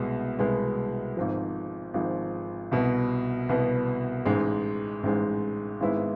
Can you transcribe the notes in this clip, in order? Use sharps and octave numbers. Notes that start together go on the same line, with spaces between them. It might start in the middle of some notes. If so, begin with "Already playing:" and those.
Already playing: C2 B2 G#3 B3
C2 B2 G#3 B3
G#1 G#2 F3
G#1 G#2 F3
C2 B2 B3
C2 B2 B3
A1 G#2 G#3
A1 G#2 G#3
G#1 G#2 G#3 B3 E4